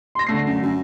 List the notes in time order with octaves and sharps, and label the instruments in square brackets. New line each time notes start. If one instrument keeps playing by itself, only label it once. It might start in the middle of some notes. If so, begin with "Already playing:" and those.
[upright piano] C6 A#6
D3 A3 C7
[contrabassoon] F#2
F#2